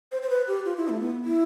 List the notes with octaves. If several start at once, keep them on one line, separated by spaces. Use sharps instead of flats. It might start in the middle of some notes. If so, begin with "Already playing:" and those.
C5
C5
B4
G4
F4
E4
A3
B3
E4